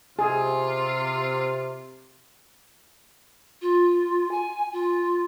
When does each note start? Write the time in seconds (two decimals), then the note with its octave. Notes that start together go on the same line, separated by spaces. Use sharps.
0.19 C3 F4 G#4
3.61 F4
4.31 G#5
4.72 F4